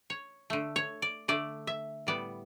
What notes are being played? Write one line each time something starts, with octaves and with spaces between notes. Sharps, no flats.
C#5
D3 A3
C#5
D5
D3 A3 D5
E5
A2 G3 B3 D5